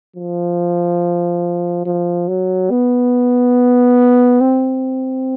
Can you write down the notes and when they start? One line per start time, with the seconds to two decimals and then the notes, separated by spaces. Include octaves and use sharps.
0.16 F3
1.86 F3
2.28 F#3
2.71 B3
4.41 C4